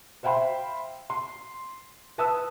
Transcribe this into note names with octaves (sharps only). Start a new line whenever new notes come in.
C5 E5 F5 G5 B5 C6
C6
B4 A5 D#6 E6